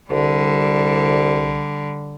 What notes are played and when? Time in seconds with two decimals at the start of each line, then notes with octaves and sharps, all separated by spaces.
0.10 C2 D3 G3